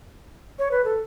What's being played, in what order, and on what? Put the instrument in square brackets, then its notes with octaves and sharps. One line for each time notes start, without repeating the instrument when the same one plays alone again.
[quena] C#5
B4
A4